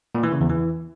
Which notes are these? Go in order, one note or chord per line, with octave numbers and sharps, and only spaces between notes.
A#2
E3
C#3
E2
E3